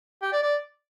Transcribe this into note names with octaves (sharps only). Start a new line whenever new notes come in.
G4
D5
D5